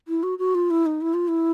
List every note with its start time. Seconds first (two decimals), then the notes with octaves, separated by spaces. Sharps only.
0.08 E4
0.23 F#4
0.39 F#4
0.55 F4
0.71 E4
0.86 D#4
1.01 E4
1.14 F4
1.28 E4